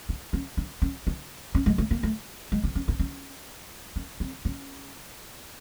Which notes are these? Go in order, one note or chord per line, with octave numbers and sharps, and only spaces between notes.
D4
C#4
D4
C#4
D4
C#4
G#3
A3
A#3
A3
G#3
D4
C#4
D4
C#4
C#4
C4
C#4